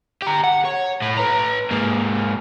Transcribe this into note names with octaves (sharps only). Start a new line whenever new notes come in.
G4 A#5
F#5
C#5
A2
B4 A#5
G#2 A#3